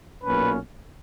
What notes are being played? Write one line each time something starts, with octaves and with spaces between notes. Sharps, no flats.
B1 A#2 A#3 C#4 B4